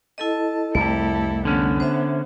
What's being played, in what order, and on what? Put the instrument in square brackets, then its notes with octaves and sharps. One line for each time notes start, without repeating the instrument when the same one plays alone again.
[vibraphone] E4 A4 D#5 [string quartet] A5
[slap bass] C2 F2 [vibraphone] A3 [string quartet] E4 G4 A4
[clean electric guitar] D3 C#4 [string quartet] B3
[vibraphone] C5 E5